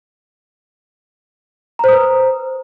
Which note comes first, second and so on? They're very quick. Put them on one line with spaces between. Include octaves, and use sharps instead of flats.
A#5 C5 D#6 B4